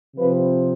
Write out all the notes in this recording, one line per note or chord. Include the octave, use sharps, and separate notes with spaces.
C3 F3 C4 B4